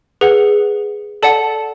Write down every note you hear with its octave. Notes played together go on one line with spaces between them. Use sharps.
G#4 B4 F#5
A4 D5 F#5 A5